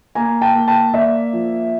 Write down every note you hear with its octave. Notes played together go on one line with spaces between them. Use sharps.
A#3 G#5 A#5
G5 A5
A#3
G5 A5
A#3 D5 E5
F3